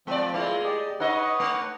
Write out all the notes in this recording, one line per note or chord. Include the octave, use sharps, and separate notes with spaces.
F3 G#3 C4 D5
G#3 A3 E4 F4
G4 D5 D#5
D#4 B4 C#5 D#5 F#5
A3